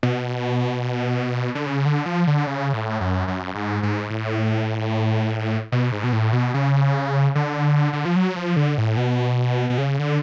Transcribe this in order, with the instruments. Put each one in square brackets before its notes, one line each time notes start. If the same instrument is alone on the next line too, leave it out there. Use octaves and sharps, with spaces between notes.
[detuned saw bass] B2
D3
C#3
D3
F3
D3
C#3
A2
F#2
F#2
G#2
G#2
A2
B2
G#2
B2
A2
B2
C#3
D3
D3
F3
F#3
F3
D3
A2
B2
B2
C#3
D3